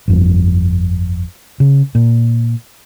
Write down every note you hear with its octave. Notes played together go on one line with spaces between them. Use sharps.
G1 F2
C#3
A#2